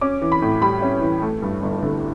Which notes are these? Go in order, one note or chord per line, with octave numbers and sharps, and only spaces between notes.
C#4 D6
E3
B5
A2
G3 B5
C#4
E3
A3
G2
G1
D3